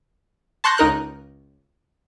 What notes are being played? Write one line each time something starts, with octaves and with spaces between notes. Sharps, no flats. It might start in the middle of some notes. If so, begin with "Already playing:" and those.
A5 C6 C#6 F#6 G6 A#6
C#2 D#4 A#4 F#6 G6